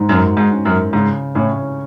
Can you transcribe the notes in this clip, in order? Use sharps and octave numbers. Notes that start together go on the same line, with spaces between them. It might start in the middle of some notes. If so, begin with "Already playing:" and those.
Already playing: G#2
F#2 F#4
G#2
C#4
F#2
G#2 C#3
A2 C#4